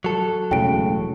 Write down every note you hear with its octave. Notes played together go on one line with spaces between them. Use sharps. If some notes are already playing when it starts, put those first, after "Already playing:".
F#3 A4
E1 A2 C#3 G5 D7